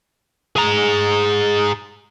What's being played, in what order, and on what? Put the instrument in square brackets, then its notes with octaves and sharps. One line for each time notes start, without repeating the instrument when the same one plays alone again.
[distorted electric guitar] G#4 A#5